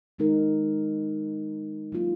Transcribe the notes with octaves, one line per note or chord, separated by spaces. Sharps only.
D#3 G#3 D#4 A#4
F#3 A#3 F4